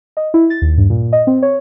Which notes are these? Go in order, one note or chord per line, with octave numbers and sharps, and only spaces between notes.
D#5
E4
A6
D#2
G2
A#2
D#5
C4
C#5